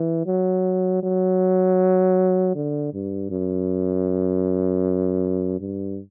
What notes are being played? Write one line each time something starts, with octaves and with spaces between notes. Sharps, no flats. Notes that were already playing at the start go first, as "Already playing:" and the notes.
Already playing: E3
F#3
F#3
D3
G2
F#2
G2